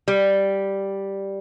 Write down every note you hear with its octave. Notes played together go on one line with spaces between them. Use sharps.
G3